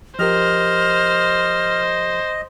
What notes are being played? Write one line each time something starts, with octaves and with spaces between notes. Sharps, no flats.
F3 G4 A#4 C5 D#5 F6